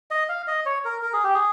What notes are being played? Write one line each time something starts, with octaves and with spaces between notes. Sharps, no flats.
D#5
F5
D#5
C#5
A#4
A#4
G#4
G4
G#4